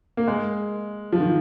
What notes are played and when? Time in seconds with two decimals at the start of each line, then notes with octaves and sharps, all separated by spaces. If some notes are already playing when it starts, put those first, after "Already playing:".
0.17 A#3
0.28 G#3
1.12 F3
1.20 D#3